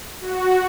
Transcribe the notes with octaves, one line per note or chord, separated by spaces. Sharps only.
F#4